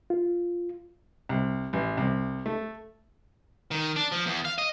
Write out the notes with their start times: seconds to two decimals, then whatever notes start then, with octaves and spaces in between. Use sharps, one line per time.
0.10 F4
1.29 C2
1.73 A1
1.97 C2
2.46 A3
3.71 D#3
3.96 D4
4.12 F3
4.26 E2
4.45 F5
4.58 D#5